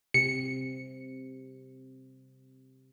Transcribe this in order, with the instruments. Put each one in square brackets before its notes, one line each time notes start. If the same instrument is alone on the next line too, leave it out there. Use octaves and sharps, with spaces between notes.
[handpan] C3 [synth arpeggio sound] C#7